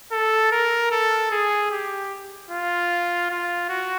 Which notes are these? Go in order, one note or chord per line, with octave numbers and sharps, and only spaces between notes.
A4
A#4
A4
G#4
G4
F4
F4
F#4